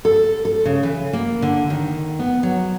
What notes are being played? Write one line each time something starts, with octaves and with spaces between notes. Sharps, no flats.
A4
A4
C#3
E3
A#3
D3
D#3
B3
F#3